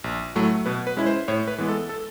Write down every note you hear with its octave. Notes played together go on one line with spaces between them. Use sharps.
A#1
A2 F#3 A3
B2 B4
B4
G#3 C#4 E4
C5
A2 C#5
B4
E3 G#3 B3
A4
A4